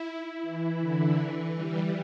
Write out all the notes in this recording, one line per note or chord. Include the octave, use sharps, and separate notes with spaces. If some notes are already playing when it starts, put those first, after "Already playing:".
Already playing: E4
E3
D3
E3
G3